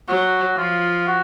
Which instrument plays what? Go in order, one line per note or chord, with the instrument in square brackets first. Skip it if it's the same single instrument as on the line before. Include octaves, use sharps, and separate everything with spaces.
[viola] F#3 [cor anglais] F#4
[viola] F3 [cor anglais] F4
[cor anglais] F#4